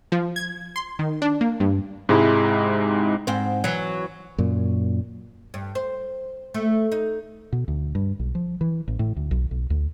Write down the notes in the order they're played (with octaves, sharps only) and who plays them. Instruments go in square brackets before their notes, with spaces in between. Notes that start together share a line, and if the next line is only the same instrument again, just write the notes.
[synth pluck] F3
G#6
C6
D#3
D4
A#3
G2
[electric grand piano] G#2 C3 G#3 D#4 E4
[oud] G#2 C4
E3 F#3
[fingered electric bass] F#2 A#2
[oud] G2
C5
A3
D#4
[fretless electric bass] B2
D2
G2
B1
F3
E3
A1
A2
D2
B1
B1
D2